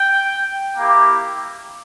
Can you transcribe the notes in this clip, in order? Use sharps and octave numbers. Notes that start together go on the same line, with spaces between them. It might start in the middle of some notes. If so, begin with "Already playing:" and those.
Already playing: G5
A#3 E4 G4